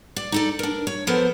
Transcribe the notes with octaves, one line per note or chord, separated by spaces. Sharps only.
D5
D#4 A4 D5
D4 A#4
C#5
F3 B3 A4 A#4 C5